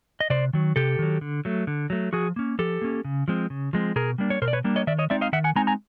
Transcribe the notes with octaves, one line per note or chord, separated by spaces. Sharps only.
D#5
C3 C5 D5
D#3 F#3
C3 G4 A4
D#3 F#3
D3
F#3 A3
D3
F#3 A3
F3 F#4 G#4
A#3 C#4
F3 G4 A4
A#3 C#4
C#3
F3 G#3 C4
C#3
F3 G#3 C4
B2 G#4 A#4
G3 A#3 D4
C#5
B2 A#4 C5
D5
B4 C#5
G3 A#3 D4
C#5 D#5
D#3 D5 E5
C#5 D#5
G#3 C4 D#4 D5 E5
D#5 F5
D#3 E5 F#5
F#5 G#5
G#3 C4 D#4 G#5 A#5
G#5 A#5